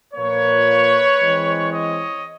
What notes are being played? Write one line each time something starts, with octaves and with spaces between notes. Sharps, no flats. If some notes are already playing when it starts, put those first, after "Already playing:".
A#2 F3 A#3 B4 C#5
E3 G#3 C4
C#5 D#5